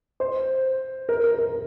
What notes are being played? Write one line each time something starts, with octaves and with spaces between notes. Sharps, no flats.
C5
A#4
A#4
A#4